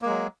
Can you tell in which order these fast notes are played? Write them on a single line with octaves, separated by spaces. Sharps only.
A#3 G#3 F#3